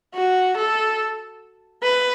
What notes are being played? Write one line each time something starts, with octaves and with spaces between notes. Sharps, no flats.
F#4
A4
B4